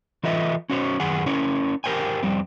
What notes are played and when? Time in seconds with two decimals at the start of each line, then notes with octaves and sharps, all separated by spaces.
0.24 E3 F4 A4 B4 D#5 E5
0.70 C#4 F#4 C5 C#5
1.00 F#2 D#3 G#4 F#5 G#5
1.26 C#4 E4 A#4 C#5
1.84 G4 A#4 C5 G5 G#5
2.23 F2 G3 C4